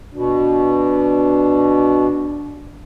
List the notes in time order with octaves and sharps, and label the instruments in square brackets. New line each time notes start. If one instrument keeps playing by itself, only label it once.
[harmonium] B2 [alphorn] D4